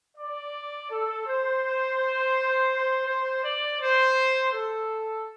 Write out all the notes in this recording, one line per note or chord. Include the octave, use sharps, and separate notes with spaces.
D5
A4
C5
C5
D5
C5
A4